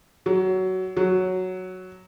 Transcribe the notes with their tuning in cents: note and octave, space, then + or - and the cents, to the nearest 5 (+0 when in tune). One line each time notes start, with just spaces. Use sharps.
F#3 +15
F#3 +0